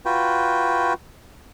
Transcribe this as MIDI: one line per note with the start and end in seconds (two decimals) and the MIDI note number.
0.06 0.93 65
0.06 0.93 66
0.06 0.93 71
0.06 0.93 79